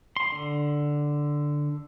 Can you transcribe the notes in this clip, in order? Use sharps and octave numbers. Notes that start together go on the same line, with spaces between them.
C6
D3